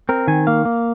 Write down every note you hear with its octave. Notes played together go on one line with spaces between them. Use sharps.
C4 A#4
D#3 G#5
A#3 F5
A#3